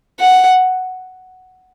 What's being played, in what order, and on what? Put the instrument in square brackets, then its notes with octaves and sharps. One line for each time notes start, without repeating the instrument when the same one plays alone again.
[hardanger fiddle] F#5